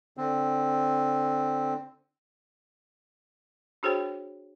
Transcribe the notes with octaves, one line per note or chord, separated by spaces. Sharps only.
D3 C4
D4 F#4 G#4 C5 C#5 G5